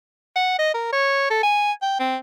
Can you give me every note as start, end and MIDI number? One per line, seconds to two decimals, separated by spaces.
0.36 0.54 78
0.59 0.72 75
0.74 0.88 70
0.93 1.30 73
1.30 1.42 69
1.43 1.72 80
1.82 1.98 79
1.99 2.16 60